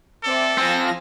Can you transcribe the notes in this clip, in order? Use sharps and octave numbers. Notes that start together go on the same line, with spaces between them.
C4 A4 D5 E5
F3 C4 F4 G#5 A#6